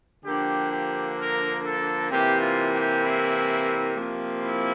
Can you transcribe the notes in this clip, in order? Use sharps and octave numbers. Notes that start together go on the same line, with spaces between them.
D3 F3 A#3 D4 G4
G4
A#4
A4
C3 E3 A#3 G4
F4
G4
E4
C3 F3 A#3
E4